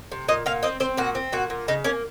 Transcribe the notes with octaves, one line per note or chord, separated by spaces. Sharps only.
C3
A#2 D#5
A#2 F5
C4 D#5
C4 C5
A#2 F#4
C4
A#2 F#4
A#2
C#3 D#4
A#3 C#4